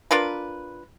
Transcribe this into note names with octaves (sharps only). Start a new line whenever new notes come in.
D4 F4 A#4 B4